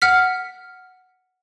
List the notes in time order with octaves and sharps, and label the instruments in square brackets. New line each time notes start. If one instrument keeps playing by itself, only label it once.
[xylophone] F#5 F6 B6